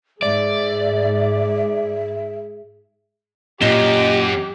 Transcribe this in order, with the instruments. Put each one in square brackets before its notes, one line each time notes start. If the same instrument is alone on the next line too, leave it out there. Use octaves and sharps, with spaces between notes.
[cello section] G#2 [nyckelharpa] G#4 [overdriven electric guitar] D5 [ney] E5
[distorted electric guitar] F#2 [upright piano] A#2 E7 G7 [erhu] G4 [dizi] D#5